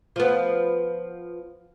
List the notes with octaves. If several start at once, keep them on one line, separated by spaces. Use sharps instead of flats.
F3 B3